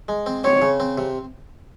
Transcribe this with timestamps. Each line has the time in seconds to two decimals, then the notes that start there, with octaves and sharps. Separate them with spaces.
0.08 G#3
0.26 C4
0.44 C4 C#5
0.62 C#3
0.80 C4
0.98 C3